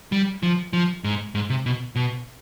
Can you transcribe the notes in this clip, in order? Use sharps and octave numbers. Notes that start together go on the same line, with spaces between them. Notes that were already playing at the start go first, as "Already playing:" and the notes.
G3
F3
F3
G#2
G#2
C3
B2
B2